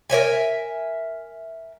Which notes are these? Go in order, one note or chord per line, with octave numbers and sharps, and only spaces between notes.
A#4 C#5 E5 G#5